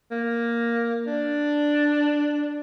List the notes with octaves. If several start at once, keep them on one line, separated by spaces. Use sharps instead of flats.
A#3
D4